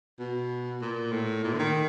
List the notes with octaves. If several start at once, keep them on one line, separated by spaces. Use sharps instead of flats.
B2
A#2
A2
A#2
D3
D#3